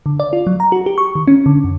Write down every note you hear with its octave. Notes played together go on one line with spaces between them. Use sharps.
D3
D5
F4
F#3
A#5
F#4
G4
C#6
D#3
C#4
D3
F#2